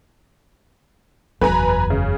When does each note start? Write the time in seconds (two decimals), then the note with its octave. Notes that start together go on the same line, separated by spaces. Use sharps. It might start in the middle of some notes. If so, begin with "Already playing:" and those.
1.41 F#1 E2 B4 G#5 A#5
1.90 C#3